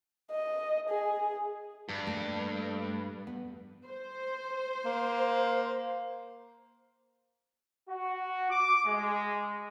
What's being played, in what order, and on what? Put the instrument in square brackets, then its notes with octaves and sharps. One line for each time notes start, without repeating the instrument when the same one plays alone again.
[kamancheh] D#5
G#4
[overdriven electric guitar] G2 [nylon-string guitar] D5
[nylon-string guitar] A3 A#3
B3
[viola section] C5
[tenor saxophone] A#3
[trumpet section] F#4
D6
G#3